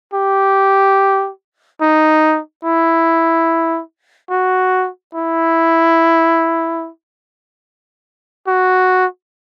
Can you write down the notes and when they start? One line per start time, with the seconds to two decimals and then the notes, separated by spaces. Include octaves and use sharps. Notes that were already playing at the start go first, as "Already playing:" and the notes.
0.14 G4
1.81 D#4
2.64 E4
4.31 F#4
5.14 E4
8.47 F#4